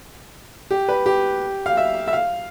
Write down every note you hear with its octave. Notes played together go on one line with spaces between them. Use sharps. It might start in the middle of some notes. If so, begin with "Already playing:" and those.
G4
B4
G4
F5
E5
E5
F5